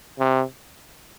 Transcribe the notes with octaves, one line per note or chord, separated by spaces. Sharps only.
C3